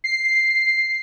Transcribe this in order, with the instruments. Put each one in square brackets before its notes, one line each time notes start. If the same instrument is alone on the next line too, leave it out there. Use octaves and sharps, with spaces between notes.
[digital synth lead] C7